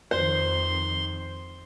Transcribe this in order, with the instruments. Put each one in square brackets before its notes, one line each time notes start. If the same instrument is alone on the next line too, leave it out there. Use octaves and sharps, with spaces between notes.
[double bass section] F2 D#3 [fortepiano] C5 [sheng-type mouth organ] C6